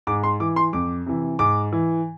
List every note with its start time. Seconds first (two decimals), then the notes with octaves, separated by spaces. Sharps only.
0.07 G#2 D6
0.23 C6
0.40 E3 D6
0.56 C6
0.73 F2 D6
1.06 C3 E3
1.39 G#2 D6
1.72 E3